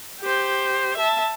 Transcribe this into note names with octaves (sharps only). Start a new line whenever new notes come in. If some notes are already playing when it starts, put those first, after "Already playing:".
G4 C5
E5 A5